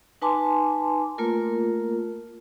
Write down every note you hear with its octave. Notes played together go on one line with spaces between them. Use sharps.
D#4 B4 G#5 A5 C6 D6
A3 A#3 F4 A#4